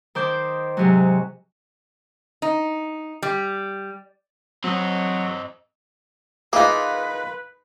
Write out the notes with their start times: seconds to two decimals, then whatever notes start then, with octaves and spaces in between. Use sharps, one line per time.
0.15 D#3 C5 C6 D6 G6
0.77 G#2 C3 F#3
2.42 D#4
3.22 G3
4.64 F#3 C4 D#5
6.53 A#3 D#4 F4 G#4 B4